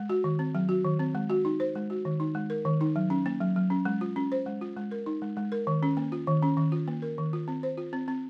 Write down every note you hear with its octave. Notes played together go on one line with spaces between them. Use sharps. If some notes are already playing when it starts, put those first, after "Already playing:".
Already playing: G#3
F#4
D#3
C4
F#3
F#4
D#3
C4
G#3
F#4
D#4
C5
G#3
F#4
D#3
D#4
G#3
A#4
D#3
D#4
F#3
C#4
A#3
F#3
F#3
C#4
G#3
F4
C#4
C5
G#3
F4
G#3
A#4
D#4
G#3
G#3
A#4
D#3
C#4
A#3
F4
D#3
C#4
D#3
F4
A#3
A#4
D#3
F4
C4
C5
F4
C4
C4